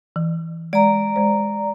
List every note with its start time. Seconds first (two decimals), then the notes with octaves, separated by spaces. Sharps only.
0.16 E3
0.73 G#3 D5 A#5
1.16 G#3 C5